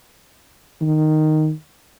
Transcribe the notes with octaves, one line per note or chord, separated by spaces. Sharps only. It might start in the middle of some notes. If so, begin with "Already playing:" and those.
D#3